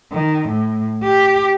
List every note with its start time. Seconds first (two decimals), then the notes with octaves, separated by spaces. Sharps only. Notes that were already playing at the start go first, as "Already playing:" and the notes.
0.13 D#3
0.49 A2
1.04 G4